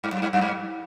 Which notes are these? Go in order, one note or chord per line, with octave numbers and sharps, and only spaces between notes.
G2
F#2
G2
F#2
G2